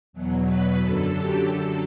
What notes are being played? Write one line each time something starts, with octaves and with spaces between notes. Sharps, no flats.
E2 B2 F#3
B4
F#2 D3 F#3 A4
G4
F#2 D3 F#3 A4